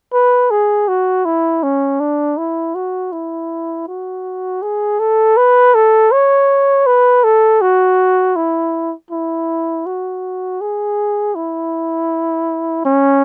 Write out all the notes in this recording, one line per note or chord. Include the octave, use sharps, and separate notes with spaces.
B4
G#4
F#4
E4
C#4
D4
E4
F#4
E4
F#4
G#4
A4
B4
A4
C#5
B4
A4
F#4
E4
E4
F#4
G#4
E4
C#4